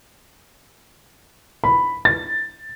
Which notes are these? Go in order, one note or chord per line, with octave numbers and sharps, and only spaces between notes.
B5
A6